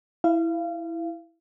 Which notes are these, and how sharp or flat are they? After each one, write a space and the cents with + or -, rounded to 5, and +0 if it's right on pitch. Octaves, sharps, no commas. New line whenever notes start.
E4 +0 F5 -25